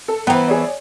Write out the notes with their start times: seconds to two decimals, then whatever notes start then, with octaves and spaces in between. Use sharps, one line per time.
0.08 A4
0.27 E3 B3 F#5 G5 A#5
0.48 G#4 C#5 D5